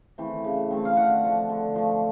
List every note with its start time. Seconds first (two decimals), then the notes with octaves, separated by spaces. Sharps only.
0.18 E3 A3 C4
0.44 C#3
0.70 E3 A3 C4
0.85 F5
0.96 D3 F#5
1.23 F3 A3
1.49 D3
1.75 F3 A3